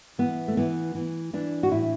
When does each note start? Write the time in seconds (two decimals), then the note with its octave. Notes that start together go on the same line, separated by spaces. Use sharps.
0.18 E3 B3
0.48 A3
0.57 E3 B3
0.95 E3
1.33 E3 D4
1.63 F#4
1.71 A2 E4